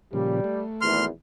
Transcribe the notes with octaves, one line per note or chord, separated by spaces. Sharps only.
A#2 C#3 F3 G3
A3
G#1 E2 C6 F6